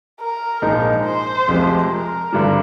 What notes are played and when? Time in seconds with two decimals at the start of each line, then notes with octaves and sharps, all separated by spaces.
0.20 A#4
0.62 A#1 G#2 F3 G#3 D#4
1.05 C5
1.48 F1 F2 C3 F3 G#3
1.91 A#4
2.32 G#1 G2 D3 G3